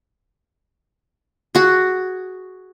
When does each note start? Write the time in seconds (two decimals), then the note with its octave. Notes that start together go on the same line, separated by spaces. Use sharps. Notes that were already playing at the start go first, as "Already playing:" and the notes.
1.55 F#4 G#4